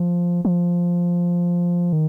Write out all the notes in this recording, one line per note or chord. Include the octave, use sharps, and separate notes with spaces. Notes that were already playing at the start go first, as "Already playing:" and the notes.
Already playing: F3
F3
D#3